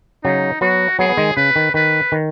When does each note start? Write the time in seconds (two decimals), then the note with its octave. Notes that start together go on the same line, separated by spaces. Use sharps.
0.24 C#3 F#3 D#4
0.61 F#3 B3 F#4
0.99 F#3 B3 G#4
1.09 B3
1.18 D#3 G#3
1.37 C#3 B4
1.56 D#3
1.74 D#3 B4
2.12 D#3